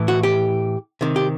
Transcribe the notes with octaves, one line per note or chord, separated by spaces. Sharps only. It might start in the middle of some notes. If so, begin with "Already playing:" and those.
Already playing: A2 E3
F#4
G4
C3 D#3
G4